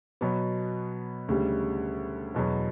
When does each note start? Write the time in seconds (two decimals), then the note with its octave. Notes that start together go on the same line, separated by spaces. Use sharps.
0.21 B2 F#3 B3
1.28 D2 C#3 G3
2.34 E2 B2 F#3